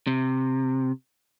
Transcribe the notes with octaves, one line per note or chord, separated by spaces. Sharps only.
C3